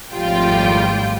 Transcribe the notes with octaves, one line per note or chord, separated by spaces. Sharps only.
G#1 F2 A2 G3 F4 G5